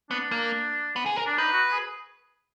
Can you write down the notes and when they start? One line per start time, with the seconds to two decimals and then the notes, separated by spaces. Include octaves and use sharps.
0.10 B3 D4
0.31 A#3
0.96 B3
1.06 G#4
1.16 A#4
1.27 D4
1.38 D#4 B4
1.52 F#4
1.71 G#4